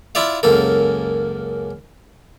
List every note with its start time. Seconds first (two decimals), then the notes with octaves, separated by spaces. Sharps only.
0.15 E4 F4 D5 E5 F5
0.43 C#2 F#2 A#3 A4